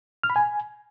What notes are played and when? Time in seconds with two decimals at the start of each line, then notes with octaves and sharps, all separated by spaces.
0.23 F6
0.30 B5
0.36 G#5